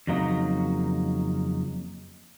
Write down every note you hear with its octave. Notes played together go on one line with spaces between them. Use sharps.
F2 C#3 F#3 A#3 D#4